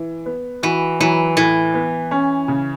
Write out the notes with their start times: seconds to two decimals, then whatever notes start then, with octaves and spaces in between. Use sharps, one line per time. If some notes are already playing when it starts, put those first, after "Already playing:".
Already playing: E3
0.26 B3
0.63 E3 F#4
1.00 E3 F#3
1.37 A2 E3
1.74 B3
2.11 C#4
2.48 C#3